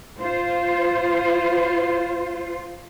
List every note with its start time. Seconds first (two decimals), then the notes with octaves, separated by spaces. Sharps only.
0.19 F4 C5